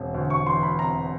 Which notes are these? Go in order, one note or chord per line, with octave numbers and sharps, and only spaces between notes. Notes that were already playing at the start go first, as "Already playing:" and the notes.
Already playing: E1 C3 E3
D2
C#6
E3 C6
B5
C3 A#5